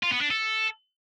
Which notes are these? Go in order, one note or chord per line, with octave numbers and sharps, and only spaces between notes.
F4
B3
D4
A4